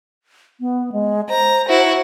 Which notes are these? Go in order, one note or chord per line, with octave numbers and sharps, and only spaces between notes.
B3
G#3
C5 A#5
E4 F#4